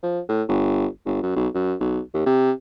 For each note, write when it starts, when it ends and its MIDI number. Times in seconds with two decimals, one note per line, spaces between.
0.03 0.20 53
0.29 0.43 45
0.49 0.87 31
1.06 1.20 31
1.23 1.34 42
1.36 1.48 35
1.55 1.76 42
1.80 2.00 35
2.14 2.26 39
2.26 2.51 48